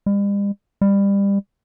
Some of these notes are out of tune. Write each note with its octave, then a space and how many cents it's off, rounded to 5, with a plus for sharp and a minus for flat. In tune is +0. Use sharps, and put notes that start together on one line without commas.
G3 +45
G3 +25